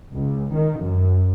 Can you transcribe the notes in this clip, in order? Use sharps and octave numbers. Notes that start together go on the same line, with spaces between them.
C#2
D#3
F#2